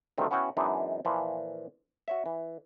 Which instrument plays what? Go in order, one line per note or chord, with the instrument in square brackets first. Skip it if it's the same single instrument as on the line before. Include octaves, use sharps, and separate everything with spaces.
[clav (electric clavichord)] D2 G2 D#3 A3 C4
B3 C#4 E4 F#4 F#5 G5
F#2 E3 G#3 B3 D4 D#4
A#2 E3 F3
F#4 C#5 E5
E3